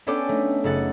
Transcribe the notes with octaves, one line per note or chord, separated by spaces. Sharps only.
B3 C#4 D4 A4 D5 G5
A3 D#4
F#1 D#4 A4 F#5 A6